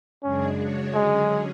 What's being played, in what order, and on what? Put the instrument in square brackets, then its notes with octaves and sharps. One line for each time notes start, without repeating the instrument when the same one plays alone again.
[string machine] F#2 C#3 G#3 D4 G#4 [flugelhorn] C#4
[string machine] C#3 G#3 D4 F#4 C#5
[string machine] D3 F#3 C#4 G#4 [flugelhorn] G#3